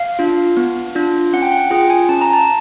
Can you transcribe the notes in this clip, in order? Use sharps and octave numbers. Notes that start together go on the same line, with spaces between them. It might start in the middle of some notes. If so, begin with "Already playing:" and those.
Already playing: F5
D4 F4
B3
D4 F4
C#4 F#5
G5
F#5
F4 G#4 G5
G#5
C#4 A5
A#5
A5